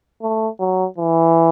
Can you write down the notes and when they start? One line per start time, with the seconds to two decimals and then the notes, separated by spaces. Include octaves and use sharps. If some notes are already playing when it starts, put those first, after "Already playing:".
0.22 A3
0.60 F#3
0.98 E3